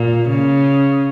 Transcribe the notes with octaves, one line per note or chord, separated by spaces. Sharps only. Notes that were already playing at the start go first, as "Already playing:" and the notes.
Already playing: A#2
C#3